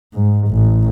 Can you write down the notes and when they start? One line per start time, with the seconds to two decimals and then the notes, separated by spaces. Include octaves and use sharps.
0.13 G#2
0.48 A1